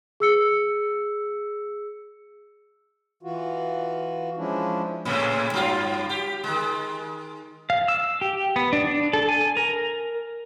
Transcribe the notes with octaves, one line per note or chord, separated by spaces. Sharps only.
G#4 E6 C#7
E3 F4 F#4
F3 G#3 C#4 D4 E4
A2 C#3 A3
G2 F#3 F4
G4
D#3 G#3
F5
E6
G4
B3
D4
D4
A4
G#5
A#4